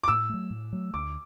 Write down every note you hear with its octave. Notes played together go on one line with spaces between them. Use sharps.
D6
A2 E6
F#3 A3
A2
F#3 A3
D2 D6